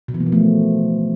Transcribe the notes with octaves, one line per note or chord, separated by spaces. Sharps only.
B2
E3
A#3
F3
A3